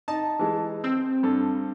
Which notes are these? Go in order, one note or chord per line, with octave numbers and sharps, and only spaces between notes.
D#4 A5
E3 G#3
C4 E6
G2 A4